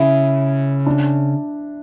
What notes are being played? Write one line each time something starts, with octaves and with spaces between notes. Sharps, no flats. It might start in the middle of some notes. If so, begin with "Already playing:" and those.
Already playing: C#3 E4
D4